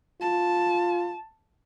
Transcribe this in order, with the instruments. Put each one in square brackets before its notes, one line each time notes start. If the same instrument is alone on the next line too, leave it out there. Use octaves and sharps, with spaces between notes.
[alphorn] F4 [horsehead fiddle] A5